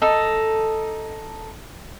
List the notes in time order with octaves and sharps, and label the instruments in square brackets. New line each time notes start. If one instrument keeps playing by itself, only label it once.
[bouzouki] D#4 A4